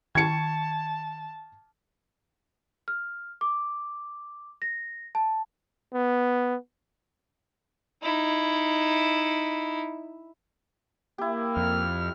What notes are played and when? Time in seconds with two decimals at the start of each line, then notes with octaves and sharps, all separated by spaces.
0.15 D#3 A5 G#6 C#7
2.88 F6
3.41 D6
4.62 A#6
5.15 A5
5.94 B3
8.02 D#4 E4
11.18 A#3 E4 G4
11.57 F2 F6